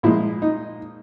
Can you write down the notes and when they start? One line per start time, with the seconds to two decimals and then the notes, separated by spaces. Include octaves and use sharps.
0.03 A#2 F3 G#3 E4
0.42 D#4